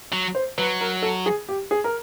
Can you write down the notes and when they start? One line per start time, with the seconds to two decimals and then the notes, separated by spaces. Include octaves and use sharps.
0.13 F#3
0.35 C5
0.58 F#3 B4
0.81 A#4
1.03 A4
1.26 G#4
1.48 G4
1.71 G#4
1.84 A#4